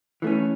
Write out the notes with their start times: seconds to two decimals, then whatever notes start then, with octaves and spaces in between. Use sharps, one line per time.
0.22 E3 A3 C#4